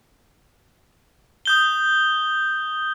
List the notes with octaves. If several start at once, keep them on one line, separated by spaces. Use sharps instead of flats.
D#6 G6 G7